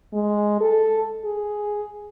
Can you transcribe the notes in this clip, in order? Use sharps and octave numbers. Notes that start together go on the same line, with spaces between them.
G#3
A4
G#4